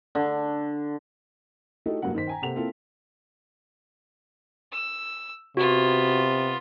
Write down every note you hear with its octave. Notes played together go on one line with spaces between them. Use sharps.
D3
A3 D#4 E4 F#4 G4 A4
F#1 G2 F#3 A#3 F#5
D#3 C5 B6
G5 G#5 A#5
C3 A#3 A4 C5 F#5 F7
A#3 C4 E4 F4 A4
E6
C3 B3 F4 F#4